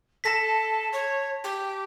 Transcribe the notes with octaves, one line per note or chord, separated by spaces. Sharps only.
A4 A5 A#6 B6
C#5
G4